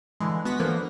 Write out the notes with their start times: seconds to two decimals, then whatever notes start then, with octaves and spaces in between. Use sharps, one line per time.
0.20 D3 E3 G#3
0.45 B3 F#4 F#5 A#6 B6
0.59 D3 E3 F3 A#3 B3